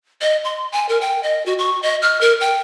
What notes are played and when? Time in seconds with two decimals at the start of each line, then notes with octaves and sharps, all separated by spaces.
0.21 D#5
0.44 C6
0.72 G#5
0.89 A#4
1.01 G5
1.23 D#5
1.46 F#4
1.58 C#6
1.83 D#5
2.02 F6
2.21 A#4
2.40 G5